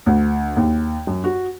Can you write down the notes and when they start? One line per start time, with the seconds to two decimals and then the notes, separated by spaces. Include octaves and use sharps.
0.06 D2
0.56 D#2
1.07 F#2
1.24 F#4